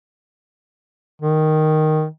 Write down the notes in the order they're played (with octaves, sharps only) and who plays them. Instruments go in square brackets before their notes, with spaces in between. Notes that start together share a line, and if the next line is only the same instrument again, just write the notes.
[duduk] D#3